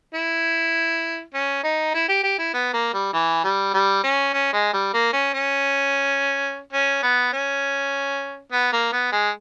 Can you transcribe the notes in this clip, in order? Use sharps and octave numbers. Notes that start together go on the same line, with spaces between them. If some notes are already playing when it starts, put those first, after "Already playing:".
E4
C#4
D#4
E4
G4
G4
E4
B3
A#3
G3
E3
G3
G3
C#4
C#4
G#3
G3
A#3
C#4
C#4
C#4
B3
C#4
B3
A#3
B3
G#3